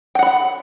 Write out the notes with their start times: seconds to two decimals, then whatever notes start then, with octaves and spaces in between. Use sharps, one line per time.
0.15 G5
0.19 F#5
0.23 B5